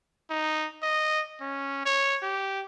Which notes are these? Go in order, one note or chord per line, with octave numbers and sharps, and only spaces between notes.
D#4
D#5
C#4
C#5
G4